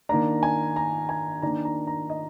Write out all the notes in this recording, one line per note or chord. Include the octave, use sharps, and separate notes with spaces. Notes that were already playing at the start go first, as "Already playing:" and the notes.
D#3 A#3 D4 A#5
G#5
A#5
G#5
D#3 A#3 D4 A#5
A#5
A#5
D#5